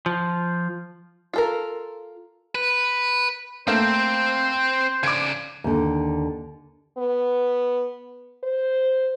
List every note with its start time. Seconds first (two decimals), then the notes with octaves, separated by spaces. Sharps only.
0.06 F3
1.33 F4 A4 A#4
2.55 B4
3.67 A3 A#3 C4 C5
5.03 C#3 D5 D6 G#6
5.64 D#2 D3
6.98 B3
8.43 C5